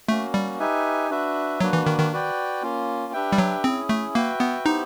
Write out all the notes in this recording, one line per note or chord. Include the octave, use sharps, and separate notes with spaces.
A3 A#3 C#4 F#4
G3
D#4 G4 B4 E5 G#5
D4 F#4 B4 E5
F#3 A#3 D4 F#4 B4
E3
D#3
D#3
F#4 B4 D5 G5
A#3 C#4 F4
D4 G4 B4 E5 G5
G3
F#3
C4 C#4 E4 G#4
A3
A#3 F#4 B4 E5 G5
B3
B3 D#4 E4 G4 C5